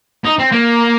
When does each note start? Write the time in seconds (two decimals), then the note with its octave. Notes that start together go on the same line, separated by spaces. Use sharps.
0.25 D#4
0.39 C4
0.52 A#3